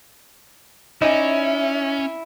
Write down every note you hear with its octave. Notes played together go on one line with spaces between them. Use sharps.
C#4 D#4 E4 D5 E5 G#5